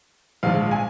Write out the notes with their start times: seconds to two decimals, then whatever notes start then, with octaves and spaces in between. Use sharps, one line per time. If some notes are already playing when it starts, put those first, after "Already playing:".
0.43 A#1 G#2 F3 F5
0.71 G#5